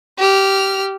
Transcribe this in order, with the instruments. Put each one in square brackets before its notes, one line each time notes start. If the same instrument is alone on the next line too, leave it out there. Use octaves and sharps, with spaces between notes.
[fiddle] G4 F6